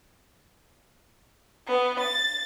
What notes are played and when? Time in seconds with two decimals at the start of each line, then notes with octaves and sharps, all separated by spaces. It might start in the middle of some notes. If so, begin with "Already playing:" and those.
1.66 B3
2.00 A6